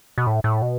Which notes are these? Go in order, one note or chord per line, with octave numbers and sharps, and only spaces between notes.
B2
A2
A2
B2